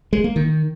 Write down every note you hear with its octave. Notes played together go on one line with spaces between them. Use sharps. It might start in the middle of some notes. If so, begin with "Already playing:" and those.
G#3
A#3
D#3